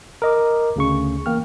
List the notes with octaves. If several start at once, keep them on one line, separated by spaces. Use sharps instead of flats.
A#4 D#5 D6
D2 C#3 C#6
E3 A#3 G5 F6